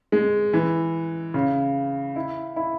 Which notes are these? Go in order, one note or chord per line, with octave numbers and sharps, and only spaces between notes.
G#3
E3
C#3
E4
E4